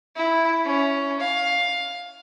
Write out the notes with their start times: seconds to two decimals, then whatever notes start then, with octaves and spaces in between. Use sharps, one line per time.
0.16 E4
0.65 C#4
1.20 F5